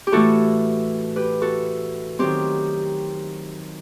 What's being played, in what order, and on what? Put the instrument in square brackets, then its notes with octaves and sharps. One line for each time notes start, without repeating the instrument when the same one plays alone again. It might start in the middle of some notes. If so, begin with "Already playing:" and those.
[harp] G4
A2 E3 A3 F#4 A4
G4 B4
F#4 A4
D#3 F#3 C4 G4